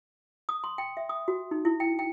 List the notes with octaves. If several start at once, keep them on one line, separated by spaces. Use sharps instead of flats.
D#6
C6
G5
E5
D#6
F#4
D#4
E4
G5
G5